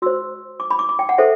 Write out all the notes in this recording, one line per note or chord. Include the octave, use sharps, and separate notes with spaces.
F#4 C5 E6
D6
B5
D6
D6
G5
F#5
A4 C5 E5